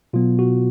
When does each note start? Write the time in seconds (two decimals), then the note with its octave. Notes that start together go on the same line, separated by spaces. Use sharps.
0.13 B2 F#3 B3 F4
0.39 F#4